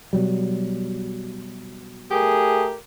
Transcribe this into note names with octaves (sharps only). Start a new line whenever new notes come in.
B2 F#3 G3
A3 G4 G#4 A#4